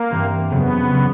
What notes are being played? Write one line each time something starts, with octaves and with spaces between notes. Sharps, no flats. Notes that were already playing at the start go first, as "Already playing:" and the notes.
Already playing: A#3
G2 E3 G3 C4
F2 C#3 F#3 B3
C#3 F#3